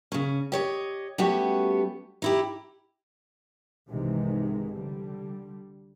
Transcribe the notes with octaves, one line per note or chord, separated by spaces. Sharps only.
C#3 C#4
G4 C#5 D#5
G3 A3 B3 C#4 F#4 G4
D#4 E4 G4
C2 G#2 C3 D#3 E3 G#3
D3 G3